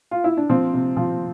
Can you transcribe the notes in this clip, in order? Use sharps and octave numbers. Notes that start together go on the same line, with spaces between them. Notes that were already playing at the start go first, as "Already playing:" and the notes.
F4
E4
D4
F3 C4
C3
F3